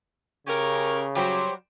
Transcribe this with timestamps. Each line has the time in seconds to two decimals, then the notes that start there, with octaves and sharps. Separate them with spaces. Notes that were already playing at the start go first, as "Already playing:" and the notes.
0.47 C#3 C#4 G4 A#4
1.15 F#3 G3 G4 C5